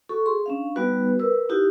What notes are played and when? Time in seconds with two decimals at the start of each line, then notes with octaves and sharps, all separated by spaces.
0.09 F#4 A4 C#6
0.26 G#4 C6
0.46 C#4 D4 F5
0.76 G3 B3 D#4 F#4 B4
1.19 A#4 B4 E6
1.49 D#4 E4 F#4 G4